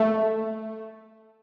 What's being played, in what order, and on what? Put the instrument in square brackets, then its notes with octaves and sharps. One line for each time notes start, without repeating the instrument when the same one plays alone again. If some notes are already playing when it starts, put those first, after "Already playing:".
Already playing: [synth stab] A3